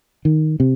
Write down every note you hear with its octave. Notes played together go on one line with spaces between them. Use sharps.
D#3
C3